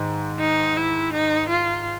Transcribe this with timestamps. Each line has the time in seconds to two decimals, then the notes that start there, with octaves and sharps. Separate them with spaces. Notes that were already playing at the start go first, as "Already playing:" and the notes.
Already playing: G#2 D#3
0.40 D#4
0.77 E4
1.13 D#4
1.49 F4